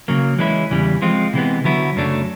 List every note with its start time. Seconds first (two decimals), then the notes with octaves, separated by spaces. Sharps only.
0.08 C#3 F#3 A#3
0.39 E3 G#3 C#4 E4
0.71 E2 C#3 E3 G3
1.02 F3 G#3 C4 F4
1.33 C3 E3 G#3 B3
1.64 D3 F#3 B3 E4
1.96 F#2 C#3 F#3 A3 D4